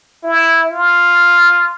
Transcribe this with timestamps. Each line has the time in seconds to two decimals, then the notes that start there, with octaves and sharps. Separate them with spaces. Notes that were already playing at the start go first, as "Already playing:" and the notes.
0.24 E4
0.72 F4